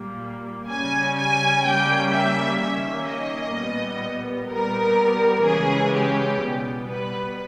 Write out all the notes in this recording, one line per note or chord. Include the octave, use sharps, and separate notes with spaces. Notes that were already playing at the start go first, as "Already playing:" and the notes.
Already playing: A#2 G3 A#3
C#3 G3 C#4 G#5
G#5
C#3 G3 A#3 C#4 G5
E5
D#3 A#3 C#4 E5
D#5
A#2 G3 B3
A#2 G3 B3 A#4
C#3 E3 G#3 C#4 G#4
G4
B2 G3 B3
B4